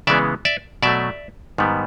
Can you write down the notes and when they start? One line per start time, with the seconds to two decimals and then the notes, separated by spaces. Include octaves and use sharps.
0.07 C#3 E3 G#3 B3 D5 E5
0.45 D5 E5
0.83 B2 F#3 A3 D5 E5
1.58 G#2 D#3 G3 B3